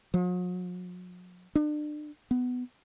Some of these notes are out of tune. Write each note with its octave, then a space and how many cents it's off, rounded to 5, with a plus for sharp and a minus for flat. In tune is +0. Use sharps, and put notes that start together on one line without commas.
F#3 -45
D4 +35
B3 +15